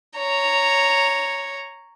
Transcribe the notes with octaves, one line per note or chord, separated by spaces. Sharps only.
C#5 A#5